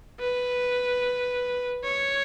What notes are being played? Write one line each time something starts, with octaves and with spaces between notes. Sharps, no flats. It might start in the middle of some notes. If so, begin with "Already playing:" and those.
B4
C#5